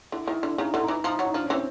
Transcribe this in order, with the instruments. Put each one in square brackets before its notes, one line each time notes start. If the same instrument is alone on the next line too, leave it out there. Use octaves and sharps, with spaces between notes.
[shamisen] D3 [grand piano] E4
[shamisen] D#3 [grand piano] E4
[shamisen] D3 [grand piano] D4
[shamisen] C#3 [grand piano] D#4
[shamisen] D3 [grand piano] E4
[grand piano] D#4
[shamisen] E3
[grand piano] E4
[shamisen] F3 [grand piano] D#4
[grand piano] E4
[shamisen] F#3
[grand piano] D#4
[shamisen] F3 [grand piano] D4
[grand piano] C#4
[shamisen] E3 [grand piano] C4